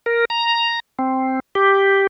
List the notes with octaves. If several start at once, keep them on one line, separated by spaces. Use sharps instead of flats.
A#4
A#5
C4
G4